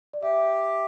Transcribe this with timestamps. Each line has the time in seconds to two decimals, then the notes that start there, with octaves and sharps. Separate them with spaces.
0.13 D5
0.23 G4 E5